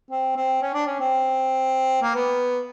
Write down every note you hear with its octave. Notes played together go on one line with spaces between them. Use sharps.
C4
C4
C#4
D4
C#4
C4
A#3
B3